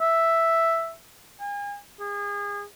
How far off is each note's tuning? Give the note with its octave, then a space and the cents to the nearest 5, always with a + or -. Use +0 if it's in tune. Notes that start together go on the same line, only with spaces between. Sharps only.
E5 +0
G#5 -40
G#4 -30